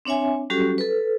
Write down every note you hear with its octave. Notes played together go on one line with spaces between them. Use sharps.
C4 D4 C#5 E5 G#5
F#3 G3 C#4 F#4 G4 A4
A4 B4